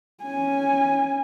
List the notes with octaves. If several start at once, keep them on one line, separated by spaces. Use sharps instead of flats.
C#4 G#5